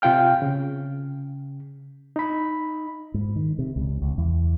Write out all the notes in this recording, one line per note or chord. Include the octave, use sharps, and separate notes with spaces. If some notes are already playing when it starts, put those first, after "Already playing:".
C3 F4 F5 G5 F6
C#3
D#4 B5
G#2
D#3
C3
C#2
C#2
E2